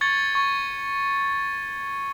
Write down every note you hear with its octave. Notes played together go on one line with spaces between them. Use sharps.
C#6 G#6 A6 C#7 G7
C#6